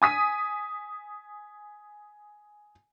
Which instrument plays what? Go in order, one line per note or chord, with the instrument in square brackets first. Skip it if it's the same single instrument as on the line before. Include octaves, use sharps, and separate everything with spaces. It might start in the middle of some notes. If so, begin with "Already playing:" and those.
[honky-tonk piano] G#5 D#6 B6 D#7